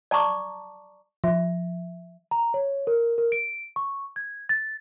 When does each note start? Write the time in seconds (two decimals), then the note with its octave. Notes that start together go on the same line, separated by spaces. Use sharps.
0.11 D5 A5 A#5 C#6 D6
1.24 F3 E5
2.31 A#5
2.54 C#5
2.87 A#4
3.18 A#4
3.32 D7
3.76 C#6
4.16 G#6
4.49 A6